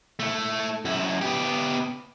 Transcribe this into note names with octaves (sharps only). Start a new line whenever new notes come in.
A3 E4
F#2 E4
B3 G4